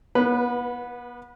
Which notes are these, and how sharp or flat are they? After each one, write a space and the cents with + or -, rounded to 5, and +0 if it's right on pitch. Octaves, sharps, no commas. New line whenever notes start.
B3 -35 B4 -5